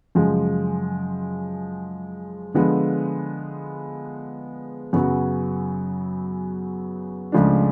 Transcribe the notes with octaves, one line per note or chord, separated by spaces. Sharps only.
F#2 C#3 F3 G#3
D3 F3 G#3 B3
F#2 C#3 F#3 B3 F#4
C#2 C#3 F3 A3 D4